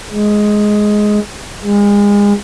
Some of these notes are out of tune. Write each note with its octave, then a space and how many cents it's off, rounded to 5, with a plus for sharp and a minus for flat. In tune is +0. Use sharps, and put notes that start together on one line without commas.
G#3 +10
G#3 -30